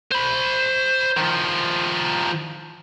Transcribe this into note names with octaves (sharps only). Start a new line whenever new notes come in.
C5 B5
D#3 F3